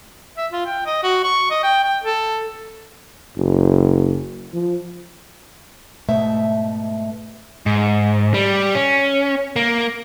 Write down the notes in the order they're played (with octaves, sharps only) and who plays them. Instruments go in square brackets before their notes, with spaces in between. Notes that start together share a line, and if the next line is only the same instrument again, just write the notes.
[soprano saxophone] E5
F4
G5
D#5
F#4
C#6
D#5
G5
G5
A4
[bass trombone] F#1
F3
[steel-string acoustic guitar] G#2 B2 A3 E5
[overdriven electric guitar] G#2
G3
C#4
A#3